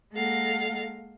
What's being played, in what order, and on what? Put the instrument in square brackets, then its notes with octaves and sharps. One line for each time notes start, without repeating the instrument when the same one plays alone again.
[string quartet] G#3 A#3 A4 F5 F#5